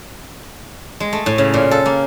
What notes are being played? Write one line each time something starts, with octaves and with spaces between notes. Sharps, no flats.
G#3
A3
A2
C#3
A#2
A4
A#3